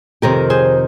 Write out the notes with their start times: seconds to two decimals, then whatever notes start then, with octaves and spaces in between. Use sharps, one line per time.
0.22 F2 C3 D#3 G4 A#4
0.50 G#4 C5